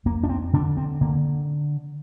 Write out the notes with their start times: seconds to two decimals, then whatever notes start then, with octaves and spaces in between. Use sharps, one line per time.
0.05 F2 A#3
0.23 D4
0.29 C4
0.53 D3 D4
0.77 C4
1.01 D3 A#3